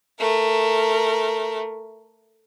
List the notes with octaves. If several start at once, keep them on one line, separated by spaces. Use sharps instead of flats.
A3 A#4